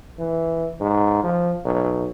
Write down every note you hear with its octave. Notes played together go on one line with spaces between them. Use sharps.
E3
G#2
F3
B1